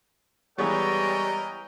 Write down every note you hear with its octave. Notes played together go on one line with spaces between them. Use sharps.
E3 G3 G#3 B3 A#4 C#5 D#5 G5